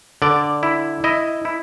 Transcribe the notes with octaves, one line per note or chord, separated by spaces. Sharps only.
D3 D5
E4
E4 D#5
E4